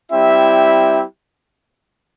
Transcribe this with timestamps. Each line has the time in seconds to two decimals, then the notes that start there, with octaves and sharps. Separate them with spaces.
0.11 G3 C4 E4 G4 E5